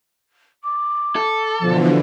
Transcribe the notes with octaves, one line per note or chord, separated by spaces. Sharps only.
D6
A4
B2 D3 E3 F3